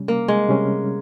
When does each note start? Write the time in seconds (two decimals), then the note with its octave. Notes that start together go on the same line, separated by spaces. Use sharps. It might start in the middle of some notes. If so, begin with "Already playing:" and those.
Already playing: C3 G3 C#4
0.08 A#3
0.28 G#3
0.49 C3 G3 C#4